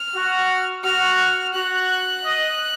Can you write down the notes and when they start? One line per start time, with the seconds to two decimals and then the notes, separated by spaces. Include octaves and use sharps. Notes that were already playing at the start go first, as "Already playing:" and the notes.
Already playing: F6
0.15 F#4
0.84 F#4 F6
1.54 F#4 F#6
2.23 D#5